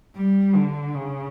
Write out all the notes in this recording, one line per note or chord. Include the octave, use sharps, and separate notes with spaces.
G3
D3
C#3